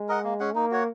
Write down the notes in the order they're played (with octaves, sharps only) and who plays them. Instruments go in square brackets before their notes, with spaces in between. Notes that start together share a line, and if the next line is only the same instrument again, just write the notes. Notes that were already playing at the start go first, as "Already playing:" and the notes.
Already playing: [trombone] G#3
[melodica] A#4 D#5 F#5
A#3
C#4 G#4 F#5
[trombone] A#3 [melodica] D#4
[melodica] F#4 C#5 F#5